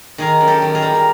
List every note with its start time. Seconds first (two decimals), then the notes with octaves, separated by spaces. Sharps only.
0.18 D#3 G#4 A#4
0.41 F#2
0.47 G4 A4
0.62 D#3
0.75 G#4 A#4
0.82 G3
0.95 A#4